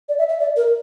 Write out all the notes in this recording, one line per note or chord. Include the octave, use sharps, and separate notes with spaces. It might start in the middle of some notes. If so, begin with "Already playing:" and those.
D5
E5
E5
D5
A#4